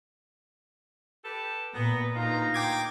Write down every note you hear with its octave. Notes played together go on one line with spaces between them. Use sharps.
G4 A4 B4
A#2 B3 B4 A#5
D2 D#4 F4 A#5
G5 D6 G#6